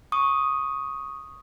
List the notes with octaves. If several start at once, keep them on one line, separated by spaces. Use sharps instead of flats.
C#6 D#6